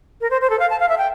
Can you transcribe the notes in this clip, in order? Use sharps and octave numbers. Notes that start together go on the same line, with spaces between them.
A#4
C5
C5
A4
F5
A5
F5
E5
G5